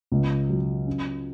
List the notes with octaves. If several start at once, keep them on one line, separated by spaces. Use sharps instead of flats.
C#2
F#3
C#4